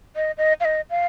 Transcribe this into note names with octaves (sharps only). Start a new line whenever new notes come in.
D#5
D#5
F5
D#5
F5